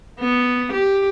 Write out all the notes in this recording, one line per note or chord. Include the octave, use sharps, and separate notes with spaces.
B3
G4